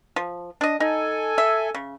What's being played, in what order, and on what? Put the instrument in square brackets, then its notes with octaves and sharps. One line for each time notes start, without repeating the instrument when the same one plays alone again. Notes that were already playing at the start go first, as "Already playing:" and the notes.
[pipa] F3
D4 D#5
[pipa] D#4 [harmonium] A4 G#5
[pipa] E5
C#3